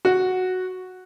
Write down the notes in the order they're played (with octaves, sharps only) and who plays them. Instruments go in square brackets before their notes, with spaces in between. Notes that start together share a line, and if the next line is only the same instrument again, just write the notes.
[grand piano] F#4